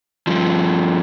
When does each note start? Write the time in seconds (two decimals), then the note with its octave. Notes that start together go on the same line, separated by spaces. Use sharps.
0.27 G2 F3